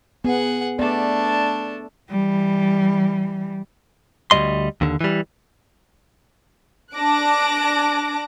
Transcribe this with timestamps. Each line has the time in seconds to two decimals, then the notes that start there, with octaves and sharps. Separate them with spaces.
0.25 B3 G#4 F#5
0.79 A3 B3 D4 D5
2.10 E3 G3
4.31 D2 D#3 G3 D#5 C6
4.81 D#2 D3
5.01 E3 G3
6.94 D4 A5 D6 F#6 A#6 D7